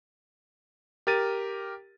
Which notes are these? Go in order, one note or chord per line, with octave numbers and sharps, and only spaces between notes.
G4 A#4 A6 D#7